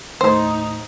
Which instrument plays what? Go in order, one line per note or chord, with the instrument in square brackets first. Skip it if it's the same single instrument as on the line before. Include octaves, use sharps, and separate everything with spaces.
[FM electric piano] D#2 A2 [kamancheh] D#4 [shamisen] C5